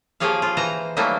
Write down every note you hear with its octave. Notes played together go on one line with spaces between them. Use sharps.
F3 A#3 G4 G#4 C#5 F5
F4
E3 C5 A#5
E3 F#3 G3 A3 A#3 D#4